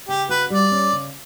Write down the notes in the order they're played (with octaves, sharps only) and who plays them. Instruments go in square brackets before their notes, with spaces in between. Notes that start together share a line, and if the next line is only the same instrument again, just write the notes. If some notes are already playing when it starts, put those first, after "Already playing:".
[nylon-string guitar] C#3 [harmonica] G4
[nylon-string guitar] F#4 [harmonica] B4
[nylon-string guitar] G3 [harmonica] D5
[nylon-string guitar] C#4
C#3